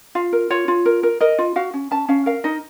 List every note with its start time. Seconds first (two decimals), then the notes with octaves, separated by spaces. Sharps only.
0.15 F4 F5
0.33 A#4
0.50 F4 C#5
0.68 F4
0.86 A#4
1.03 A#4
1.21 A#4 D#5
1.39 F4
1.56 F#4 F5
1.74 C#4
1.91 C#4 A5
2.08 C#4 F5
2.26 A#4 F5
2.44 D#4 D#5